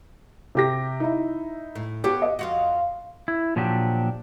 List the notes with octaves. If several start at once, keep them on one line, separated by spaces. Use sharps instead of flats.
C3 G4 A#6
D#4 E4
A2
B3 G4 A4 C#5
D#5
F2 F4 F#4
E4
A#2 F3 F#3 D4 G4